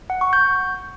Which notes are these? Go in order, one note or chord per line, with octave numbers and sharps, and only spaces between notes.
F#5
C#6
G6